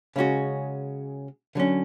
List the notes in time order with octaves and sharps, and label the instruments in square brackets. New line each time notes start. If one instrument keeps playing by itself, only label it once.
[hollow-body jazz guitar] C#3 G#3 C#4 F#4
D3 F#3 C#4